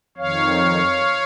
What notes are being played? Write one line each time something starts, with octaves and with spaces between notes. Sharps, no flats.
F2 D#3 C#5 F5